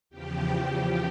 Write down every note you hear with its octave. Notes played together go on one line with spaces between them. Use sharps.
E2 C#3 F3 G4 G5